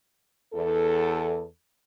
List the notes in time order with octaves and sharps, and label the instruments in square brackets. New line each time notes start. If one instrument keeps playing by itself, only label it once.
[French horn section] E2 A4